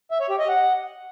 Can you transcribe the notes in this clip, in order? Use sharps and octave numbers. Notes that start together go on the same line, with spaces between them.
E5
C#5
G4
D#5
F#5